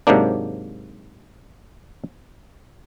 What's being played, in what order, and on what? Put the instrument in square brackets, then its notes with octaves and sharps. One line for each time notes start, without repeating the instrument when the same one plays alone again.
[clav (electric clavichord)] G#2 C3 F#3 A#3 D4